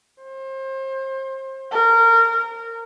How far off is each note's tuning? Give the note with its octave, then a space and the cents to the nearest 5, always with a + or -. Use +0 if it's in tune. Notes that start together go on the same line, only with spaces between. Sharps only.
C5 +30
A#4 -20